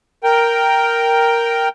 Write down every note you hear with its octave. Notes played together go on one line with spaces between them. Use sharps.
A#4 G5